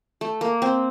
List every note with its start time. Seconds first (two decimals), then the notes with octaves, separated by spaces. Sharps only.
0.21 A3
0.41 A#3
0.62 C4